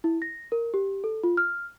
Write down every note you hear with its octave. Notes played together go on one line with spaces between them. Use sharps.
E4
A#6
A#4
G4
A4
F4
F6